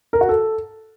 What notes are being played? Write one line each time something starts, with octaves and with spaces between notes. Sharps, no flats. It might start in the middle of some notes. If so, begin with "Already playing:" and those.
A#4
F#4
A4